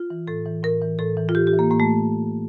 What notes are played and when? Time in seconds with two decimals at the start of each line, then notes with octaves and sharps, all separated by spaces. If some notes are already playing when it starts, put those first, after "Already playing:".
Already playing: F4
0.10 E3
0.27 A2 A4
0.45 E3
0.63 A2 A#4
0.82 E3
0.99 A2 A4
1.17 E3
1.29 F4
1.35 A2 G4
1.47 G4
1.53 E3
1.59 A#3
1.70 A2 A#3
1.80 A3